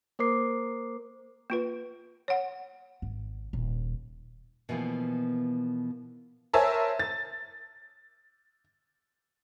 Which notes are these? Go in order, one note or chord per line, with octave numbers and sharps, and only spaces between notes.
A#3 A#4 C5 D6 C7
A#3 F4 B4
C#5 F#5
G#1
D#1
B2 E3 F3 A#3 B3
A#4 C5 C#5 E5 G#5 A5
A6